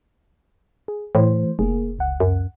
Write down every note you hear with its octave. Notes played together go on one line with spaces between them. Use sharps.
G#4
A2 E3 A3 C5
F1 A#3 G#4
C#2 F#5
F#2